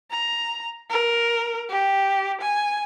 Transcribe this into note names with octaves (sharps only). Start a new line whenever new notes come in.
A#5
A#4
G4
G#5